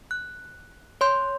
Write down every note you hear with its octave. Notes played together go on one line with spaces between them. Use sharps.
F#6
C#5 C6 G6